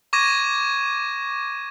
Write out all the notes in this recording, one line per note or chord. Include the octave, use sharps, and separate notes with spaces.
C#6 D6 G#6 A#6 D#7